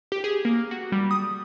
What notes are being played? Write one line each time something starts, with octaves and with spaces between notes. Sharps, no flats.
G4
G#4
A#3
F#4
G3
D#6